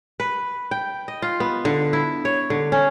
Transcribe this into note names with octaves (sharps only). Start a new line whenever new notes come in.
B4
G5
D#5
F4
B3
D3
E4
C#5
D3
C#4